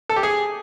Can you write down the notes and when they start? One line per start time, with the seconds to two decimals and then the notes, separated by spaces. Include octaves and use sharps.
0.09 A4
0.16 G4
0.23 G#4